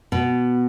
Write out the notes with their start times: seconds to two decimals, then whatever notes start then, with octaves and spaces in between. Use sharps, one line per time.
0.12 B2